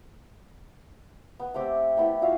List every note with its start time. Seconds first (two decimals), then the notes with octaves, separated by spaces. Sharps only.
1.39 B3
1.54 A3 C4 G4 D6
1.97 A3 B3 E4
2.22 F4 F#4 E5 F5